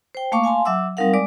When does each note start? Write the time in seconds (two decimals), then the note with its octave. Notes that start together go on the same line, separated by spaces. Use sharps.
0.15 C5 G5
0.32 A3 A#3 F5 A5 C#6 D6
0.44 F5 G#5 A5 C6
0.65 F#3 E5 F#5 D6 E6
0.97 G3 C4 D#4 A#4 F5 F#5
1.13 G#3 D5 D6